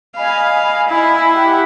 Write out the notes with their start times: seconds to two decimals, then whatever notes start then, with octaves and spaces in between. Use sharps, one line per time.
0.16 D#5 F5 G#5 B5
0.88 E4
1.34 G4 F#5 G5